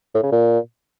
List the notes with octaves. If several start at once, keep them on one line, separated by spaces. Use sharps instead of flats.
A2
C#3
A#2